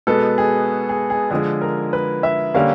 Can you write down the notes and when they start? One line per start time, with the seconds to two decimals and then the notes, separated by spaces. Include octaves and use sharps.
0.07 B2 G#3 B3 A4
0.38 G#4
0.89 G#4
1.10 G#4
1.30 D3 F3 G#3 G#4
1.61 A#4
1.93 B4
2.23 E5
2.54 D3 G3 A#3 C#4 F5